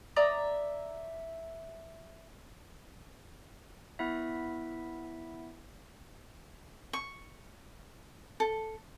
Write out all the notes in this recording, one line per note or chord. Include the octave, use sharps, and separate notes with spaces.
D5 E5 A#5 D#6
B3 E4 E5
C#6
A4